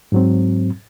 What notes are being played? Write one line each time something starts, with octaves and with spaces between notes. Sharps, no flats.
G#2 F#3 C4